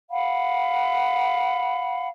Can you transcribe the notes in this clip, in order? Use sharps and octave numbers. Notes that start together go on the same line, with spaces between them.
F5 F#5 B5